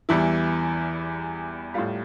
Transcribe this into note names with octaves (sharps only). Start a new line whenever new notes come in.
E2 E3 G3 E4
A2 G3 F4